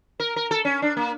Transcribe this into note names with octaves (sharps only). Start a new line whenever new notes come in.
A#4
A#4
A4
C#4
D4
A#3